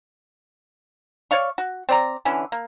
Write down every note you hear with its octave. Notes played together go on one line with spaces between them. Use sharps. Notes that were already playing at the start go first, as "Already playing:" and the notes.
C#5 D5 F5 C#6
F#4
C4 D5 A#5
D3 E3 C#4
A#3